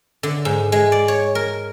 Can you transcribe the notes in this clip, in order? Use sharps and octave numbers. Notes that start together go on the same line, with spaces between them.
D3
G#2
G#3
D5
C#5
A#4